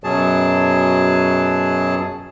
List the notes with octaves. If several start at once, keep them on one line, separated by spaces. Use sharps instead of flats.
F#2 B2 F#3 G#4 A5